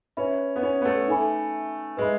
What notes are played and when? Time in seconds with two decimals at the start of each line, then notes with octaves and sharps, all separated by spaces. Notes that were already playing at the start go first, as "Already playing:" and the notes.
0.17 C#4 B4 E5 B5
0.56 B3
0.63 C#4
0.81 B3
0.85 A3
1.08 D#4 A4 E5 G#5 B5
1.97 G#3 B4 E5 B5